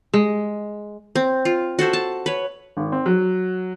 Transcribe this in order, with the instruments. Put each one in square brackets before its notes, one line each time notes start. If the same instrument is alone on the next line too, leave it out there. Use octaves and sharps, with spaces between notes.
[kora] G#3
[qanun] C4
F4
F#4 A4 C5 E5
A5
B4 C#5
[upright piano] G#1
C4
F#3